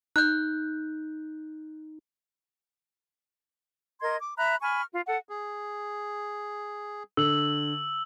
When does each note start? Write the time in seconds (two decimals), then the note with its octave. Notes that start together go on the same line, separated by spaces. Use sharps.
0.16 D#4 F#6 G6
4.01 A#4 D#5 C6 G#6
4.22 D6
4.37 E5 A#5 B5 F#6
4.61 G#5 B5 C#6 F6
4.91 F4
5.07 A4 F#5
5.29 G#4
7.17 D3 E6 F#7